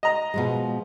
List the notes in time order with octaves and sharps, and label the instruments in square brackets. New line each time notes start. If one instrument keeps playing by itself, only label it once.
[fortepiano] D#5 A#5
[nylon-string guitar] B2 F3 G#3